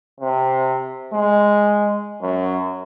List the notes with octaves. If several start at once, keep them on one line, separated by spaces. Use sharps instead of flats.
C3
G#3
F#2